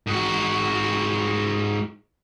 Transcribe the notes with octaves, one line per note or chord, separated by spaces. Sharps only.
G#2 F#4